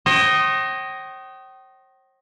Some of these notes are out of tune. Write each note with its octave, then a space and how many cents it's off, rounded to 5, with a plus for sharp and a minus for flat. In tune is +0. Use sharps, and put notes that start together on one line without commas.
C5 +45 D#5 +0 G5 -35